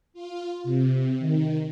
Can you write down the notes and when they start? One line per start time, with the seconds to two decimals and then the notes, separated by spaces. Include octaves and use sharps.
0.14 F4
0.64 C3
1.19 D#3